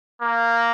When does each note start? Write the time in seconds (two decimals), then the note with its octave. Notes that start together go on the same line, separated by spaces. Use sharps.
0.22 A#3